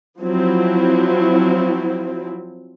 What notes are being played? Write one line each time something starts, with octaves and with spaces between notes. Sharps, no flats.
F3 F#3 C4 E4